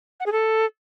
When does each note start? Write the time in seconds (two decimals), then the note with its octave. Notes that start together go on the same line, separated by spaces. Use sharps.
0.20 F#5
0.26 G#4
0.32 A4